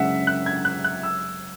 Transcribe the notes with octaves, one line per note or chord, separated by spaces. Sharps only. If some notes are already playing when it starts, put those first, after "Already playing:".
Already playing: F#2 C#3 G#3 E4 E5 F#5
F#6
G#6
F#6
F#6
E6